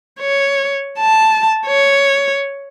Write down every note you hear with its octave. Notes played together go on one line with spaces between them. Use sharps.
C#5
A5
C#5